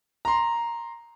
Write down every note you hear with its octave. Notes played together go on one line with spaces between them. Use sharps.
A#5 C6